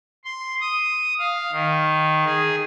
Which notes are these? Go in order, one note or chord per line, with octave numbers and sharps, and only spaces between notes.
C6
D#6
F5
D#3
G#4